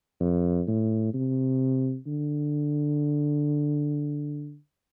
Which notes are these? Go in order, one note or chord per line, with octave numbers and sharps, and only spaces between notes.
F2
A2
C3
D3